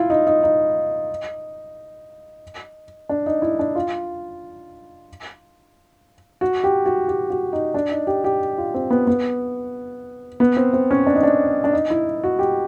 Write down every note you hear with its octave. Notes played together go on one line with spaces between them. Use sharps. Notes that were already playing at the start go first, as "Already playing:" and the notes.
Already playing: E4 F4
D#4
D#4
D#4
D4
D#4
E4
D4
F4
F#4
G4
F#4
G4
F#4
D#4
D4
D#4
G4
G4
F4
C4
B3
B3
B3
C4
C4
C#4
D4
D#4
D4
D4
D#4
E4
F#4
G4